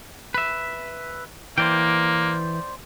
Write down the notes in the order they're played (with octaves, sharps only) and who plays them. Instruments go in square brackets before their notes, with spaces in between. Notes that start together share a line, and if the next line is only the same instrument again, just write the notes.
[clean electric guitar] B4 E5
[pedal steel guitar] E3 [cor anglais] A#3 [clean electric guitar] C5 D5 G5